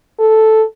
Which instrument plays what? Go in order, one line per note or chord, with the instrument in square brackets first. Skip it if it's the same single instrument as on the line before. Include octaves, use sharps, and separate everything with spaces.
[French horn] A4